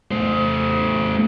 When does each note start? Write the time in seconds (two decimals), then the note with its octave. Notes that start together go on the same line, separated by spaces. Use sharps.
0.11 A3 C5